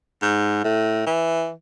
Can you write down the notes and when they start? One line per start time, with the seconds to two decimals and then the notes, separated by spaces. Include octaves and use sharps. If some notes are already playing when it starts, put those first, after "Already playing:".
0.22 G#2
0.64 A2
1.07 E3